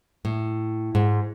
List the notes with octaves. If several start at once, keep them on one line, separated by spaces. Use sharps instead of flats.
A2
G#2